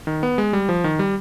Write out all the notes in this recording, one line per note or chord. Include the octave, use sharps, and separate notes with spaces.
D#3
B3
G#3
G3
F3
D#3
G3